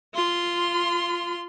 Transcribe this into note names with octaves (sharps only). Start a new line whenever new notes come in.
F4 C6